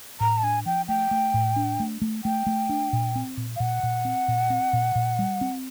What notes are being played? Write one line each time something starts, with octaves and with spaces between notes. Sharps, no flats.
A2 A#5
A5
D4 G#5
F3 G5
A3 G5
A3
A2
D4
A3
A3
A3 G5
A3
D4
A#2
C4
A#2
F5
A#2 F#5
A#2
C4
A#2
C4
A#2
A#2
G3
C4